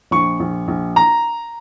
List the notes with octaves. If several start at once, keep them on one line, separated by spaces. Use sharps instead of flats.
A#1 C#6
A#1
A#1
A#5